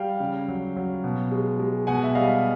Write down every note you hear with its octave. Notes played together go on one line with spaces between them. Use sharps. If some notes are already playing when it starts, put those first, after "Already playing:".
Already playing: G3 F5 G5
C#3
F#3
F#3
B2
G#3
G#3
B2 F#5 G#5
E5
G3 D#5 F5